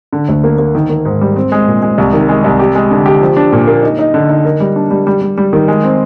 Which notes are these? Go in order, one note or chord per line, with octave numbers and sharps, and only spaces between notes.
D3
D2
A#3
A#3
D#3
D#3
G#2
G3
C4
G#3
A#2
G#3
C2
D#3
G#3
C2
G4
G#3
D3
G4
F3
D4
A#2
A#3
D#4
D#4
D3
D#4
A#4
G3
D4
G3
G3
G3
G3
D#3
G#3
C4